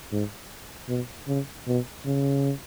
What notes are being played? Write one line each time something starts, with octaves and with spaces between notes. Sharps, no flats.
G#2
B2
C#3
B2
C#3